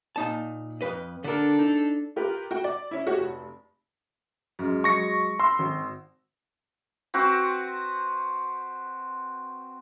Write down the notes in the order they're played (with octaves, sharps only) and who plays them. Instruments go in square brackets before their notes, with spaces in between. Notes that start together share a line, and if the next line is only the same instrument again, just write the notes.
[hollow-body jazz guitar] A#2 D#4 A5
F2 B4 D#5
[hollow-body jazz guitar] D3 A#4 [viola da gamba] D4 A4
[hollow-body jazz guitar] D#4
[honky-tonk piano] F4 G4 A#4 B4
F#4 G5
D5
C#4 E4
F#4 G4 C#5
F1
[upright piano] F#2 G#3
[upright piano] F#3 G#3 [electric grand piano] C#6 A#6 C#7
[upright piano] B5 E6 [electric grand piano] C6
[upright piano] G#1
[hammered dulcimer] C4 F#4 B4